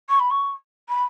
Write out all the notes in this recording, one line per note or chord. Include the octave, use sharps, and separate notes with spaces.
C#6
B5
C#6
B5